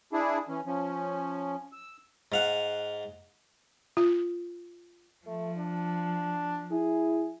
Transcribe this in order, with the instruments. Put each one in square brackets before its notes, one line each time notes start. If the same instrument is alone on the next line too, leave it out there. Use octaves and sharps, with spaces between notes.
[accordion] D4 E4 G#4
E3 C#4
F3 C#4
E6
[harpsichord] G#2 F5 F#5
[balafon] F4
[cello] F3 [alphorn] A3
[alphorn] D4
[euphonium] E4 [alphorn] G#4